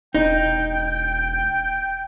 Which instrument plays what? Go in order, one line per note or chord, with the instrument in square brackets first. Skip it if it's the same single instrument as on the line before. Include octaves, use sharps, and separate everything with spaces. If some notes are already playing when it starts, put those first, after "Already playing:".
[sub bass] E1 [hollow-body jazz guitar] D#4 [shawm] G5